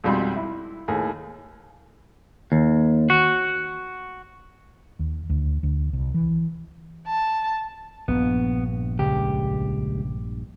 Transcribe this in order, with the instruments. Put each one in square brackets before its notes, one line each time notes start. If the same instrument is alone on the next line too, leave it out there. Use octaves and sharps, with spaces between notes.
[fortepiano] B1 F2 G3 G#3
E4
D#2 A2 G#4
[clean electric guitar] D#2
F#4
[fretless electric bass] D#2
D2
D2
C2
E3
[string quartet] A5
[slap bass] A#1 G2 [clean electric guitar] B3
[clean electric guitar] C#2 G4